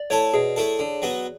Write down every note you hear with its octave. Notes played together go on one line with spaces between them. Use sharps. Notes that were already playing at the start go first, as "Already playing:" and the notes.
Already playing: D5
A3 E4 A4 C#5
B2 G#4
A3 E4 A4
D3
F#3 B3 F#4